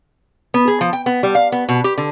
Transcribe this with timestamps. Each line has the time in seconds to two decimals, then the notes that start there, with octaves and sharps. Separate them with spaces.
0.54 B3
0.68 G#4
0.81 F3
0.93 G5
1.06 B3
1.23 G3
1.35 F5
1.52 B3
1.69 B2
1.84 G4
1.98 D3